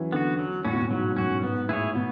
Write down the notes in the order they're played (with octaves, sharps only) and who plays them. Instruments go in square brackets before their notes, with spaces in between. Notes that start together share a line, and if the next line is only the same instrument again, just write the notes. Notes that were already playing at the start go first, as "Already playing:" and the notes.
Already playing: [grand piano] E3 F#3 C#4
[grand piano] D3 [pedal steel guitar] B3 F#4
[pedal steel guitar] F#3
[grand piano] A2 [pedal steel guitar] C#4 F#4
[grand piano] B2
A2
[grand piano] G#2 [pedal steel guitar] F#3
[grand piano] F#2 [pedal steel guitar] C#4 F#4
[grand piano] G#2 [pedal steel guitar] B3
[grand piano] A2 [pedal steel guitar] E4 G#4 C#5
[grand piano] B2 [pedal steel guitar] B3